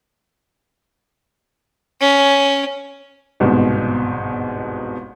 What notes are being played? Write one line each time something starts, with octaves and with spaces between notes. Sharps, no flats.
C#4
G1 C2 G#2 B2